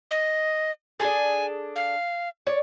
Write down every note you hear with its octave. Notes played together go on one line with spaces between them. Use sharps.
D#5
D4 G#4 A4 G#5
F5
C#5 D5